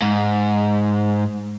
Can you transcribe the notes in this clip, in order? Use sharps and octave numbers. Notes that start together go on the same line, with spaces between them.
G#2